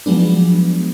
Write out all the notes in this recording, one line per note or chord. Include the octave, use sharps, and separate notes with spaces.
F3 F#3 G#3 B3 D4